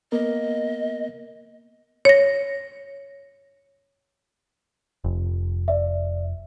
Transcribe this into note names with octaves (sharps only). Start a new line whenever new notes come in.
A#3 B3 A#4 D#5
C#5 A#6
F1
D5 E5